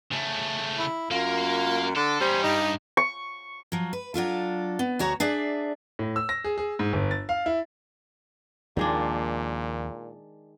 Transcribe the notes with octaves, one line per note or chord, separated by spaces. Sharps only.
C#3 A3
E4
F#2 A#3 F4
D3 A4
G3 C#4 D#4 C5
G2 D#4 G4
C#6
F3 F#3
B4
F#3 D4 F4 A4
B3
D2 F#4 C#5 A#5
D4 G#4 D5 E5
A2
E6
A#6
G#4
G#4
G#2
G1
A6
F5
E4
D#2 A#2 D#3 F3 G#3 D4